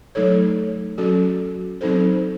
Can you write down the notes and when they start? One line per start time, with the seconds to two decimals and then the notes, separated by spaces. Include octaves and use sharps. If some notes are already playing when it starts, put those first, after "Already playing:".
0.15 F#3 A3 D#4 A4 C#5
0.98 F#3 C#4 F#4 A4
1.81 F#3 C4 D#4 A4 C5